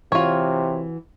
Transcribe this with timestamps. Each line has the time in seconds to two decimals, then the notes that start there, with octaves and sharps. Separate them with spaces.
0.12 C3 E3 F4 F#4 C#5